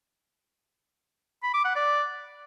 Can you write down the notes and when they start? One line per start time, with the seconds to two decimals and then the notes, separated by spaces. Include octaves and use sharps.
1.43 B5
1.54 D6
1.65 F#5
1.76 D5